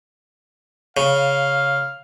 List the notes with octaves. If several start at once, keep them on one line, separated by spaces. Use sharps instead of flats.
C#3 F5